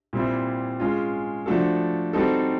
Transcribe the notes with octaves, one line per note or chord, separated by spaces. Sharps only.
A#2 G3 C4 E4
G#3 C#4 F4
F3 A3 D4 F#4 A4
G3 C4 D#4 F#4 A4